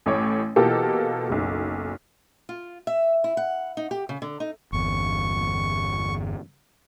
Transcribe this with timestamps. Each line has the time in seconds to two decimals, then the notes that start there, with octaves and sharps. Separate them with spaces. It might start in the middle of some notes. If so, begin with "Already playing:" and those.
0.06 A1 A2 C#5 D6
0.56 B2 E3 A#3 F4 G4 A4
1.29 F#1 B1
2.49 F4
2.87 E5
3.24 E4
3.37 F#5
3.77 D#4
3.91 G4
4.09 C#3
4.22 D3
4.40 D#4
4.73 G1 E2 C#6